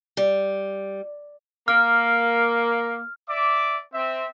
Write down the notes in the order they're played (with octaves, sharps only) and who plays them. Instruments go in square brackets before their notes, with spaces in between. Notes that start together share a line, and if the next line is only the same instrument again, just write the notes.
[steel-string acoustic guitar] G3
[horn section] A#3 [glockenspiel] F6
[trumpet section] D5 E5 D6
C4 E5